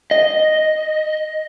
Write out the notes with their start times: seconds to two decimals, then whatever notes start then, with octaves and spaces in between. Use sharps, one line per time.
0.11 D#5